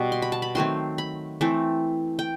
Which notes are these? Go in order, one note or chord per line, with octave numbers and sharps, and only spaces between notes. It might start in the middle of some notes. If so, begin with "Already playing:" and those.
Already playing: B2 G3 B3
C6
B5
A5
B5
D#3 F#3 A3 C4 C6
B5
E3 A3 C4
G5